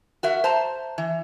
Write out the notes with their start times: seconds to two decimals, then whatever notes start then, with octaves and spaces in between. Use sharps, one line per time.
0.23 F#4 A#4 E5
0.44 C5 A5 A#5
0.98 E3